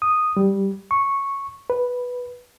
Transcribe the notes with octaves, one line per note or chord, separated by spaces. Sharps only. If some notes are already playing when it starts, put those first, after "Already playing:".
D#6
G3
C#6
B4